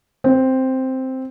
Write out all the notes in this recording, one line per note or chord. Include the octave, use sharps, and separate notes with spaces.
C4